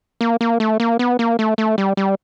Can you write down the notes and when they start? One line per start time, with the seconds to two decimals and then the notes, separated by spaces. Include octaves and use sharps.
0.21 A#3
0.41 A#3
0.60 A3
0.80 A#3
0.99 B3
1.19 A#3
1.39 A3
1.58 A3
1.78 G3
1.97 G3